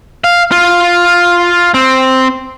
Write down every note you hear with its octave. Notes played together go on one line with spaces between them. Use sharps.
F5
F4
C4